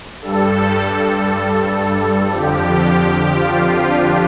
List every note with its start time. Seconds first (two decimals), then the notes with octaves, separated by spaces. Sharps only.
0.22 G2 G3 A4
2.31 F2 D3 F3 G4
2.82 G4
3.35 F4
3.87 D4